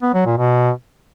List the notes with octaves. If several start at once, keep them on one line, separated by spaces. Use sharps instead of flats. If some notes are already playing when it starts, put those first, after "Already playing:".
B3
F#3
A#2
B2